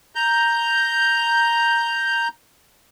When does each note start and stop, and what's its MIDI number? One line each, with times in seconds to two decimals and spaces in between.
0.15 2.28 82
0.15 2.28 91